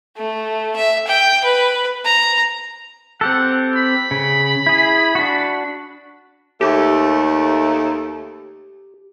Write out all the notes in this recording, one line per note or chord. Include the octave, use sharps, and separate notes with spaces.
A3
E5
G5
B4
A#5
C4 G4 A4 F#5
B5
C#3
E4 G#4
D4 F#4
D#2 A3 G4